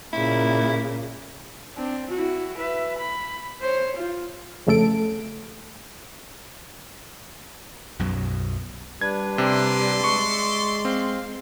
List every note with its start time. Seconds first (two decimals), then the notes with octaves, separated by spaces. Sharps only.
0.13 A#2 C#3 A#3 E4
1.76 C4 D4
2.10 E4 F#4
2.58 B4 E5
2.98 B5
3.62 C5 C#5
3.96 F4
4.67 F2 C#3 A3 A4 D7
7.99 B1 F#2 B2 F#3
9.01 G3 D4 B4 G#6
9.38 C3 D5 E5 C6
10.04 G#3 C#6
10.85 C4 F5